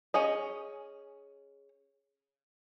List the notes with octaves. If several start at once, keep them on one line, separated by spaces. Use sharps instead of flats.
C#4 G#4 D#5